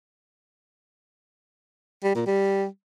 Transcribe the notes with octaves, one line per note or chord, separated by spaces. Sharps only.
G3
A#2
G3